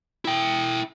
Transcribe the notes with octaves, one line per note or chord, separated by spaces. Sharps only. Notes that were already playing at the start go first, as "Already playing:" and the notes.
E4 G5